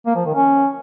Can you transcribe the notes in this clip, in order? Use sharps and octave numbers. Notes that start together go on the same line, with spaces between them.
A#3
F3
D#3
C#4